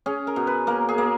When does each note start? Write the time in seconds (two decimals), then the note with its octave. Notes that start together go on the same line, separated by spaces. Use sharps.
0.06 C#4 G#4
0.27 A#4
0.36 B2
0.47 B4
0.67 A#3 A#4
0.89 G#4
0.98 A#3